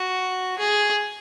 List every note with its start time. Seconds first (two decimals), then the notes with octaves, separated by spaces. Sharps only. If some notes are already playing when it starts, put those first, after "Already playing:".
Already playing: F#4
0.58 G#4